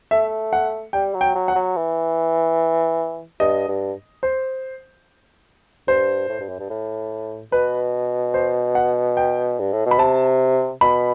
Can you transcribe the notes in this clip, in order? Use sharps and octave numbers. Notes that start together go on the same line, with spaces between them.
A3 E5
F#5
G3 G5
F#3
G5
F#3
F#5
F#3
E3
G2 D#5
G2
C5
G2 C5
A2
G2
F#2
G2
A2
B2 B4
C5
F#5
G5
G2
A2
B2
B5
C3 A5
B2 B5